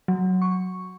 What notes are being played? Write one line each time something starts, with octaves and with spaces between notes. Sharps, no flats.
F#3
C#6